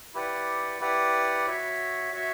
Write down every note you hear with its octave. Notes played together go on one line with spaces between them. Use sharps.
E4 G4 B4 D5 F#5
E4 G4 B4 D5 F#5
F#4 C#5 E5
F#4 C#5 E5